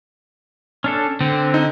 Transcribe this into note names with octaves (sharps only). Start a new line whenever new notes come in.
C#4 D4 A4
D3 C4
D#4